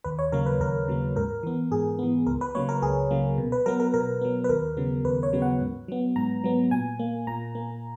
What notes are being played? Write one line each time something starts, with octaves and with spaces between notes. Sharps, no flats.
D#2 B4
C#5
C#3 F#3 A#3 A#4
B4
D#2 A#4
C#3 F#3 A#3
G#2 A#4
E3 B3
G#2 G#4
E3 B3
C#2 A#4
B4
C#3 F#3 A#3 C#5
A#4
C#2 G#4
C#3 F#3 A#3
B2
B4
F#3 B3 A#4
A#4
B2 A#4
F#3 B3
B4
D#2 A#4
C#3 F#3 B3
D#2 B4
C#5
C#3 F#3 B3
F#5
G#2
F#3 B3
G#2 A#5
F#3 B3
A#2 G#5
A#3
A#2 A#5
A#3